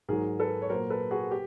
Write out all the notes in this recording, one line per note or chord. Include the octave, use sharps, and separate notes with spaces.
G#2 D#3 F#3 G#4 A#4
A4 B4
C#5
A#2 F#3 A#4 C5
A4 B4
F#4 G#4
G4